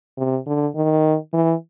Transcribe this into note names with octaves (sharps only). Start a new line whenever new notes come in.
C3
D3
D#3
E3